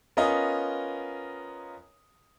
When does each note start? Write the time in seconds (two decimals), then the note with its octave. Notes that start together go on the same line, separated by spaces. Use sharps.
0.17 B3 C#4 F4 A#4 D#5